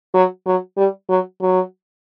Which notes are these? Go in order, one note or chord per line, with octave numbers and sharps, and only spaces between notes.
F#3
F#3
G3
F#3
F#3